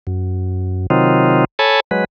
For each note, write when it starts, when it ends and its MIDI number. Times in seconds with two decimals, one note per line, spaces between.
0.07 0.87 42
0.90 1.45 48
0.90 1.45 51
0.90 1.45 54
0.90 1.45 60
0.90 1.45 63
0.90 1.45 65
1.59 1.80 69
1.59 1.80 73
1.59 1.80 80
1.59 1.80 81
1.59 1.80 83
1.91 2.04 54
1.91 2.04 56
1.91 2.04 71